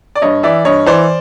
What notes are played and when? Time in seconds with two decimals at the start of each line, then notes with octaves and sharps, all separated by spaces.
0.16 D5
0.22 G2 C#5 D#5
0.43 E3 D5 E5
0.65 G2 C#5 D#5
0.86 E3 C5 D5